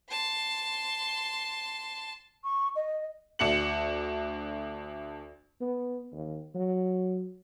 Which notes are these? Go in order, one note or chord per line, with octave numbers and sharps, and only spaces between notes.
A5 C6
C#6
D#5
D2 D4 C#7 F#7
B3
D#2
F#3